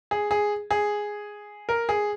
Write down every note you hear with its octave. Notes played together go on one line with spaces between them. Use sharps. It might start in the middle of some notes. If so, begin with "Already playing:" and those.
G#4
G#4
G#4
A#4
G#4